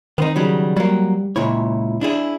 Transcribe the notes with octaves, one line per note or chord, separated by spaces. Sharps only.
D#3 B3 C4 D#4
C#3 F#3 G3
F#3 G3 A#3
C#2 A#2 E4 C#5
D4 E4 G#4